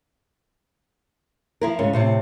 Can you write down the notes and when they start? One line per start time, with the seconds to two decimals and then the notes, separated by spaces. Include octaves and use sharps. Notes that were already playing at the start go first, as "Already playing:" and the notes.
1.61 F3 E4 A#4
1.79 G#2 C#3 C#4
1.93 A2 C3 C4